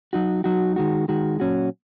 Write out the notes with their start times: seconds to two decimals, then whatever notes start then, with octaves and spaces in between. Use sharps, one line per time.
0.13 F#3 D#4 F#4
0.44 F#3 D#4 F#4
0.76 D#3 G#3 F#4
1.08 D#3 G#3 F#4
1.40 A#2 F#3 C#4 F#4